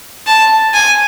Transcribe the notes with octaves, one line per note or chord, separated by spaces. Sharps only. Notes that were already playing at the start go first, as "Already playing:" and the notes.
A5
G#5